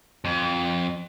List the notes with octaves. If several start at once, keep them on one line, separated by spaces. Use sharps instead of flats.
F2